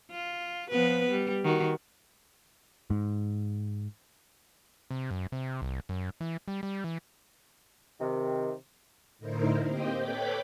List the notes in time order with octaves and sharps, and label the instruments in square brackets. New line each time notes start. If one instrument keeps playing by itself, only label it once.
[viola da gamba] F4
F3 B3 B4
G3
D#3 F#4
[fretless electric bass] G#2
[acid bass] C3
F#2
C3
C2
F#2
E3
G3
G3
E3
[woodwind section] C3 D#3
[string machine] A2 D3 D#4 E4 A#4 C5
A#3 C4 G4 C5 D#5 G5
A4 B4 C#5 G5 B5 D6